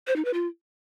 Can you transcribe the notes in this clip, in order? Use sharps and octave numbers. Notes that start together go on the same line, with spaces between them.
C5
D#4
B4
F4